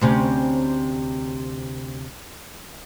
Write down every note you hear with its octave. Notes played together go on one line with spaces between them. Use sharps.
D2 C3 C#4